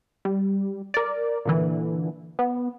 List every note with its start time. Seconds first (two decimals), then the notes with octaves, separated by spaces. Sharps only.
0.25 G3
0.94 A#4 D5
1.45 A#2 D3 E3
2.39 B3